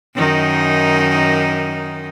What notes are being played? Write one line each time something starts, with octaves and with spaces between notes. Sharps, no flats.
F#2 D#3 D#4